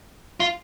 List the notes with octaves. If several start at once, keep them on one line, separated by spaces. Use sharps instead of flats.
F4